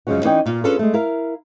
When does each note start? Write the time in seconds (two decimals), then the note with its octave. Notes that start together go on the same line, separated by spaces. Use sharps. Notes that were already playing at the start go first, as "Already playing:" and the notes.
0.07 F#2 C#3 F3 G#3 C#4 F#4
0.24 E3 C#4 D#4 D5 D#5 G5
0.46 A#2 F4
0.64 C#4 D4 F4 G#4 A4 B4
0.79 G#3 A3
0.94 E4 A#4 F5